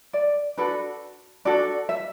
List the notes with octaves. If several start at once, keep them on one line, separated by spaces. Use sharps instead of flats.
D5
D4 F#4 A4 B4
D4 F#4 A4 D5
E5